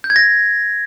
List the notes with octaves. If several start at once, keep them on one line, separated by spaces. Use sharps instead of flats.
G6
G#6
A#6